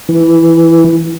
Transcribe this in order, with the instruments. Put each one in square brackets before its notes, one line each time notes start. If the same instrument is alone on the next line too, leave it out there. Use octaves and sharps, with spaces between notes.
[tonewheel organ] E3